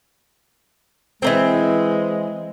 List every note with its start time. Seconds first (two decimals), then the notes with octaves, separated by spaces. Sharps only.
1.22 E3 G#3 A#3 C4